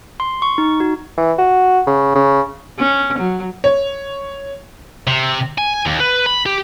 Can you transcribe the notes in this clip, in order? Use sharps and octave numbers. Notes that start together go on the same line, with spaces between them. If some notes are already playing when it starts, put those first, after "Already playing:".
C6
C#6
D#4
F#4
E3
F#4
C#3
C#3
C#4
F#3
C#5
C3
G#5
D#2
B4
B5
G4